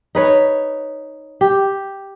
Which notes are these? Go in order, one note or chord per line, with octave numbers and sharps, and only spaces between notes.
D#4 B4 C#5
G4